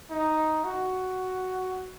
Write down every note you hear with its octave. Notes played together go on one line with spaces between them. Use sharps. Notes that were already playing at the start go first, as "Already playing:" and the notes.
D#4
F#4